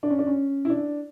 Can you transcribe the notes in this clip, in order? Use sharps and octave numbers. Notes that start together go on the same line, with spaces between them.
D4
C#4
D4
C#4
E4
D4